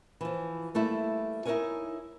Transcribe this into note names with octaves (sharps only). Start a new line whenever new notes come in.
E3 F3
G3 A3 A#3 E4
D#4 E4 G#4 A#4 C#5 G#5